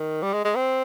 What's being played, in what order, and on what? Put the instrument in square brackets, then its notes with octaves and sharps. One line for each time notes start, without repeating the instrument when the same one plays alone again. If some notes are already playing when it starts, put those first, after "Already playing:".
Already playing: [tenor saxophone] D#3
G3
G#3
G#3
C4